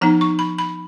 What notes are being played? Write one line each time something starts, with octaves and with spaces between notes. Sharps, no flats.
F3 B3 D#4 A#5
C#6
B5
B5